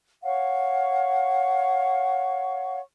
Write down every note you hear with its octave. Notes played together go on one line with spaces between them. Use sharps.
C#5 F5 F#5 C#6